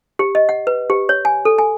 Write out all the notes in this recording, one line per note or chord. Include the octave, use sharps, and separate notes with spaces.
G4
D#5
F#5
B4
G4
C#5
G#5
A4
G#5